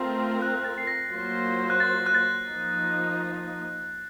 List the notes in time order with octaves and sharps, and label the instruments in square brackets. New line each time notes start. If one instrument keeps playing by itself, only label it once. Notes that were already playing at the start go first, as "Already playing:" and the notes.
Already playing: [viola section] A3 C4 F4 A#4
[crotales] F#6
A6
C7
A#6
[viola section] F#3 A#3 F4 C5
[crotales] F#6
A6
F#6
A6
[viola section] F3 A#3 D#4